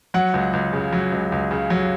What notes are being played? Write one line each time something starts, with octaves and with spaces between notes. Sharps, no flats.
F#3 F#5
C#2
C#2
C#3
F#3
C#2
C#2
C#3
F#3